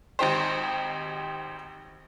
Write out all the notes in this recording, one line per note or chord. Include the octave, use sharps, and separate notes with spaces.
G#1 D#4 G4 C5